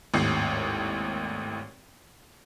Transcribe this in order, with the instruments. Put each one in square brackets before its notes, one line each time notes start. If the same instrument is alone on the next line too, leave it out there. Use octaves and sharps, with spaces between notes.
[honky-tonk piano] G#1 D#2 A2 C7